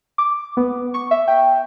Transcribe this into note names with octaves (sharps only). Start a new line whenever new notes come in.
D6
B3
C#6
E5
G5